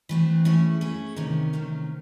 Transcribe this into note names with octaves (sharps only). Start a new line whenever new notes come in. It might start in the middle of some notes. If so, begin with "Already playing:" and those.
E3 A3 C4
A3 C#4 E4 G#4
A3 C#4 E4 G#4
C3 D#3 A3 C#4
C3 D#3 A3 C#4